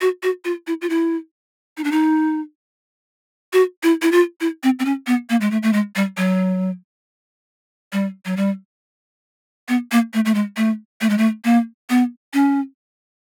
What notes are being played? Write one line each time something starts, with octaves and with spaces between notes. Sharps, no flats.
F#4
F#4
F4
E4
F4
E4
D#4
D4
D#4
F#4
E4
E4
F4
E4
C4
C4
C#4
B3
A#3
G#3
A3
A3
G#3
G3
F#3
G3
F#3
G3
B3
A#3
A3
A3
G#3
A3
A3
G#3
A3
A#3
B3
C#4